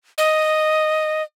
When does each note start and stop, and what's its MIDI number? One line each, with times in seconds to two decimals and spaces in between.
0.18 1.22 75